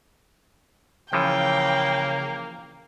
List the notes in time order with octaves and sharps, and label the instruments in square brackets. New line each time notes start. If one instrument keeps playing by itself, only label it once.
[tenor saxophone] C#3 [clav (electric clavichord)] E3 F3 [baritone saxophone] A#3 [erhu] G5